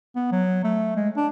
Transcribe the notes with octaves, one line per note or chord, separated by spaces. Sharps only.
B3
F#3
A3
G#3
D4